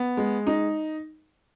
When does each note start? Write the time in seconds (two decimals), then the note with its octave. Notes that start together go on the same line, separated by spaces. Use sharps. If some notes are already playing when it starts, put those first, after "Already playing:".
Already playing: B3
0.17 G#3
0.47 D#4